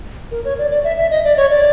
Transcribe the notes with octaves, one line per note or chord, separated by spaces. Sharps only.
A#4
C#5
D5
D5
E5
E5
D#5
D5
C#5
D5